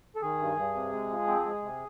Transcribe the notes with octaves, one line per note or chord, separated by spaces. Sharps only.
A4
D#3 G#4
G2
G2
C3
G#3
F3
C4
G#3
C3